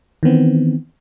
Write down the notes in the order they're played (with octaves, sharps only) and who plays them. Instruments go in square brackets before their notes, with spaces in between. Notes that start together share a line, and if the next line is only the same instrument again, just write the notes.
[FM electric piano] D#3 E3 B3 C4